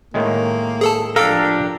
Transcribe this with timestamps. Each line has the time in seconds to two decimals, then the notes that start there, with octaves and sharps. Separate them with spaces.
0.14 A2 D#3 G#3 A#3
0.81 G#4 A4 A5
1.16 F3 D4 G4 A4 A#4 F5 E6